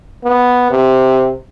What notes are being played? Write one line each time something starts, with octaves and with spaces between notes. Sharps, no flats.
B3
C3